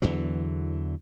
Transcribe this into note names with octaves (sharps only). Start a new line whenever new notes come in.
E2 D3 E3 F#3